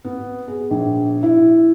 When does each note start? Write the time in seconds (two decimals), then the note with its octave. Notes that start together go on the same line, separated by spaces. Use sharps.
0.04 B3
0.48 G#4
0.71 A#1
1.23 E4